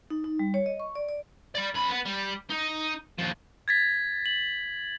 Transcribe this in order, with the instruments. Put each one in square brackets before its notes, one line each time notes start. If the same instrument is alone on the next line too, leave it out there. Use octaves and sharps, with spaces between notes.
[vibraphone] D#4
D#4
G3
C#5
D#5
C#6
D5
D5
[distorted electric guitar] D5 B5
F#2 B5
B3
G3
D#4
D#2 F3
[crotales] G#6 A6 B6
F#7